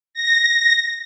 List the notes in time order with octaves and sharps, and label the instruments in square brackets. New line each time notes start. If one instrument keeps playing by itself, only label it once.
[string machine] A#6